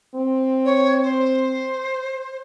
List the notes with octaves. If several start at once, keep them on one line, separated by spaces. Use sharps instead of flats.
C4
C#5
C5